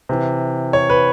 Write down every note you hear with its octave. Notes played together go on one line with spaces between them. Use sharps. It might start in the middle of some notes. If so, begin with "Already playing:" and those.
C3 E3
C#5
B4